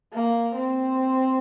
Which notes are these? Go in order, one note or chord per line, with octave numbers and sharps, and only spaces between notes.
A#3
C4